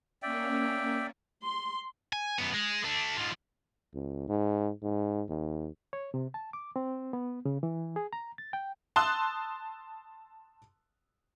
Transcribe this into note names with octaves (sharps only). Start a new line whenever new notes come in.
A#3 C#4 D5 E5 G5
C6
G#5
F#2 B3
G#3
A3 D4
G#2 F3
C#2
G#2
G#2
D#2
C#5
C3
A5
D6
C4
B3
C#3
E3
G#4
A#5
A6
G5
A5 C6 D#6 E6 F#6